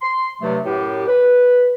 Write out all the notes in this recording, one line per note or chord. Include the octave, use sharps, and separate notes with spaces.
C6
G2 C3 F#3 A3
F#2 A2 G4
B4